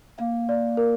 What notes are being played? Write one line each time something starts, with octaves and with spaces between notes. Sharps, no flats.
A#3 F5
D5
A#4